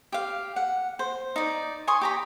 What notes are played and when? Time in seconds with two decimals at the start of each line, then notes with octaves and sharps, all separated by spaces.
0.12 G4 F5
0.56 F#5
0.99 C5
1.36 D#4 D5
1.87 G#5 C6 C#6 D#6
2.01 G4 A#5 B5